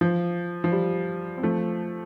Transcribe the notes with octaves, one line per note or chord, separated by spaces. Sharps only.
F3
F3
G3
C4
F3 A3